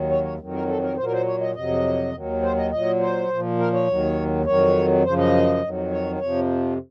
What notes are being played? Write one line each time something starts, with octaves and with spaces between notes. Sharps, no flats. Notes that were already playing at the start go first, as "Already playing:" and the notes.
Already playing: D#2 D#3 F#3
C#5
C#5
F2 D#3 F#3
A#4
A4
A#4
A#2 F#3 C5
A#4
C5
C#5
D#5
F2 C3 F#3 D#5
D#2 D#3 F#3
C5
D#5
A#2 F#3 D#5
C5
A#2 F3
A#4
C#5
D#2 D#3 F#3
F2 D#3 F#3 C#5
F#2 C#3 F3 C5
D#5
F2 D#3 F#3
C#5
F2 C3 F3 C#5